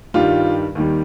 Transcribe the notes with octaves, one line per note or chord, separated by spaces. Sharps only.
G2 D#3 G3 F4
D#2 D#3 G3